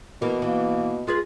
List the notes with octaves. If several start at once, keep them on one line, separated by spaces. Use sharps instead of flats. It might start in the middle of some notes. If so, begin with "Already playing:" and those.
B2 E3 A#3
E3 A#3
G#3 F4 G#4 B4